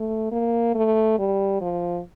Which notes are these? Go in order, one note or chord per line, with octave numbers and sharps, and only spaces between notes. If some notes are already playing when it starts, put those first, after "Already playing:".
Already playing: A3
A#3
A3
G3
F3